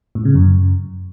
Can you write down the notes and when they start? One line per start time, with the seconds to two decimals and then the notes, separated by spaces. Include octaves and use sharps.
0.15 A2
0.25 C#3
0.35 F#2